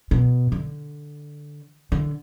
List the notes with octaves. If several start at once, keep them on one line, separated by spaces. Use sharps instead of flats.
B2
D3
D3